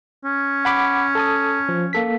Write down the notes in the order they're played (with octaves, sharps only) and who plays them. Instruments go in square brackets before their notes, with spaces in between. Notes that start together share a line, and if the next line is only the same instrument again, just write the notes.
[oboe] C#4
[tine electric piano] F#5 B5 D6
A4 A5 D#6
F3
A#3 A4 B6